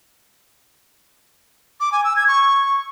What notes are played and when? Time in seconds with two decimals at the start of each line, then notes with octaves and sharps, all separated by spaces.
1.80 D6
1.92 G#5
2.04 E6
2.16 G#6
2.28 C#6